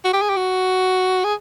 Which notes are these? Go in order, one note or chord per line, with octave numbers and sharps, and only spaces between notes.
F#4
G4
G#4
G4
F#4
G#4